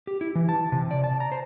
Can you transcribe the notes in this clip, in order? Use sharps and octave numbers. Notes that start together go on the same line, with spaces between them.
G4
E4
E3
A5
C3
D5
A5
A#5
C5